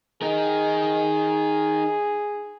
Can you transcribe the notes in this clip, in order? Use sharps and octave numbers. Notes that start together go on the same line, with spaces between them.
D#4 G#4 A#4